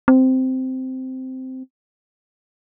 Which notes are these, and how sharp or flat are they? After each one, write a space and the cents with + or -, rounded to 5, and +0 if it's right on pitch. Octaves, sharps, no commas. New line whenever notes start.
C4 -10